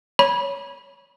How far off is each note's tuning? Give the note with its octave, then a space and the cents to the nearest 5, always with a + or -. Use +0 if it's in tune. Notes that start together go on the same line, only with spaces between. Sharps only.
C#5 +5 B5 -20